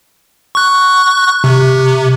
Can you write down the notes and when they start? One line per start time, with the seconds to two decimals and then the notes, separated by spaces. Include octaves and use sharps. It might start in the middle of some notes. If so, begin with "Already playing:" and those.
0.55 C#6 F#6
1.44 C3